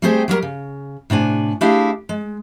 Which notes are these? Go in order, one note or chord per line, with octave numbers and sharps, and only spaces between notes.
G3 A3 C4 G4 G#4 C5
F#3 G3 F#4 A#4
C#3
A2 C3 D4 G#5
A3 D4 E4 G4 G#4 F5
G#3